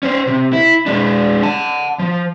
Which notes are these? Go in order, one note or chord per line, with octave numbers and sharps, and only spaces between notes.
C#4 C5
C3
E4
G#3 D4
F#5 A5
F3